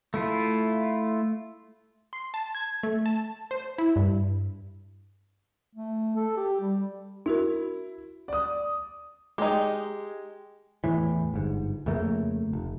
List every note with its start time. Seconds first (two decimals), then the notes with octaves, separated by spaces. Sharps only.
0.14 A3 E4 F4
2.13 C6
2.34 A5
2.55 G#6
2.83 A3
3.06 A5
3.51 C5
3.78 E4
3.96 G2
5.75 A3
6.16 A4
6.37 G4
6.61 G3
7.26 D4 E4 F#4 A#4
8.28 D5 D#6
9.38 G#3 D#4 G4
10.84 E2 A2 E3
11.34 G1 G#2
11.86 F2 C#3 A3 A#3
12.53 F1